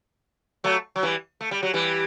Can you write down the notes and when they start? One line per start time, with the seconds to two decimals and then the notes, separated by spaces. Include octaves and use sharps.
0.64 F#3 A3
0.96 F#3
1.03 E3 G3
1.41 A3
1.51 G3
1.63 F#3
1.74 E3 G3